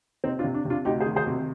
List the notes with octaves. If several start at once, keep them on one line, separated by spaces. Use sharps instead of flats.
C3 C4 D#4
D4 F4
C3
D4
C3 D4 F4
D2 D#4 G4
G#4 C5
D#3
G#4 C5
C3